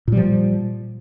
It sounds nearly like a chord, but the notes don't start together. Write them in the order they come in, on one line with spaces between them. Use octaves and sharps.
A#2 G3 F3